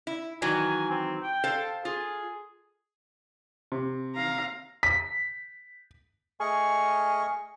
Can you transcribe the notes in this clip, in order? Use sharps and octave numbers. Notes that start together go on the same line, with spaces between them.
E4
D#3 E3 F#3 G#5
C4
G5
A4 C5 F5
F4 G#4
C3
F5 A#5
B6
A3 G#4 D#5 C#6 F6